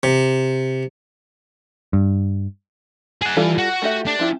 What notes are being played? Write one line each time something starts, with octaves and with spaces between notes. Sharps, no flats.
C3
G2
G#4 F#5
E3 G3 F4 A4
F#4
A3 G4 E5
D4
F3 E4 G4